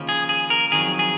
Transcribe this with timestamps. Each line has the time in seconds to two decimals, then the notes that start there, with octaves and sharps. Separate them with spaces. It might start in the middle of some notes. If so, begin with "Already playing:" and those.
Already playing: D#2 C#3 F3
0.09 G#4
0.29 G#4
0.50 A#4
0.71 F2 D#3 F#3 G#4
0.99 G#4